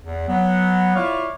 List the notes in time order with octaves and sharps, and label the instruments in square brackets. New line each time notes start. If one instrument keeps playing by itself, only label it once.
[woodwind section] E2
F#3 B3
E4 F4 C#5 D5 F5